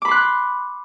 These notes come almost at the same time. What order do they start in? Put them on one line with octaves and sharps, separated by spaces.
D6 B5 C6 F#6